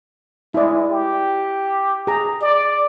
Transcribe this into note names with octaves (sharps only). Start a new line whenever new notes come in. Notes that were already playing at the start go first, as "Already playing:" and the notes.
G#3 E4 D5
G4
G#4 A#5
D5